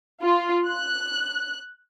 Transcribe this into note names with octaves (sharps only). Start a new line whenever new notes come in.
F4
F#6